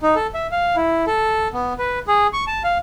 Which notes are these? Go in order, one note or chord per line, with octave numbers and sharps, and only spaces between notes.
D#4
A4
E5
F5
E4
A4
B3
B4
G#4
C#6
A5
F5